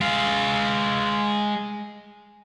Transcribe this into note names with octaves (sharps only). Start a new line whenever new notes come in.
G#3 F5